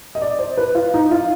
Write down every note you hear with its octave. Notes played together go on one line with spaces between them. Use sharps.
D#5
D5
C5
B4
F4
D#4
F4